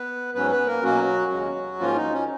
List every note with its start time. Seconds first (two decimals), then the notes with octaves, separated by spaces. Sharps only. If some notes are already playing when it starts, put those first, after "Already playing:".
Already playing: B3 B4
0.34 G#2 F#3 B3 C#4 B4
0.50 B3 B4
0.67 A#3 A#4
0.83 B2 F#3 A#3 C#4 F#4
1.31 D#2 C#3 G#3 C#4
1.79 G#2 F3 A#3 C#4 F4
1.96 D#4
2.12 C#4